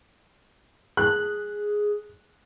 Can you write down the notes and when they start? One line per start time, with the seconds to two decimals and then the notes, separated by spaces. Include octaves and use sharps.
0.97 G#4 F#6